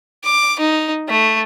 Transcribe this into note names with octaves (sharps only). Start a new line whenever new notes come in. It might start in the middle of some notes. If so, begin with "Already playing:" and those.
D6
D#4
A3